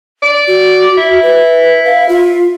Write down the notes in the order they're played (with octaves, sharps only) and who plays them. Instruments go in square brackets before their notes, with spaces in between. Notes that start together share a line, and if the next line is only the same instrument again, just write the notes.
[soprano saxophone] D5
[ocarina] F#4
[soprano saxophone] E4
[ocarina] B4
F5
F4